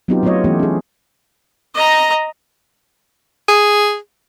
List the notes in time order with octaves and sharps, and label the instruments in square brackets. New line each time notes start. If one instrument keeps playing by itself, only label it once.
[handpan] F#3 B3 C4 D#4 F4 G4
F#3 A3 B3 F4 C#5 D#5
E3 A3 B3 C#4 F4 G4
C#4 G#4
[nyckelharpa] D#5 A#5
[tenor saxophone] G#4